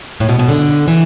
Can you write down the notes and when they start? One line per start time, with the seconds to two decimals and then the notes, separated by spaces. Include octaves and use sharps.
0.20 A2
0.29 B2
0.39 B2
0.49 D3
0.88 E3